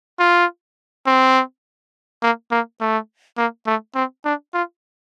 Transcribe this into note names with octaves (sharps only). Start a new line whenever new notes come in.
F4
C4
A#3
A#3
A3
A#3
A3
C4
D4
F4